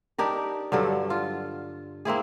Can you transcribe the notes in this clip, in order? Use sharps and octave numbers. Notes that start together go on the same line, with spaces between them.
D4 D#4 G4 A#4
G2 D3 F#3 A4
F4
A#3 C4 E4 G#4